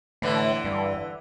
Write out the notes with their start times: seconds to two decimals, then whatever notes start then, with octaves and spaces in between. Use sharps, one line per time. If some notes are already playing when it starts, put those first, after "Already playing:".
0.22 A2 D3 E3
0.65 G2